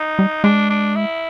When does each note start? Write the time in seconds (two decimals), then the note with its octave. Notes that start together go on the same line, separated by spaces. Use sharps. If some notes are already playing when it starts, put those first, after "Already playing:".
Already playing: D#4
0.19 G3
0.44 G#3 D4
0.70 D4
0.96 E4